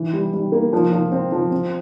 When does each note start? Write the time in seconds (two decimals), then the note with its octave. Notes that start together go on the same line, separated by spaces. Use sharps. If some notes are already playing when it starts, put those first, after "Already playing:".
Already playing: E3
0.13 G3
0.33 G3
0.52 A#3
0.73 F3
0.92 F3
1.12 C4
1.32 F3
1.51 C4